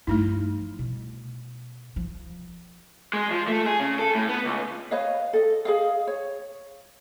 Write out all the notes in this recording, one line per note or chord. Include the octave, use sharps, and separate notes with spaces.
G2 F3 A3 D#4 E4
B2
F3
G#3
F3
A3
G#4
C#3
A4
A2
B3
C#2
B4 C#5 D#5 F5
A4 D#5
G#4 D#5 F5
C#5